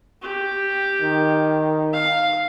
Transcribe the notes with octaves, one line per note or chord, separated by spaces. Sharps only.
G4
D#3
F5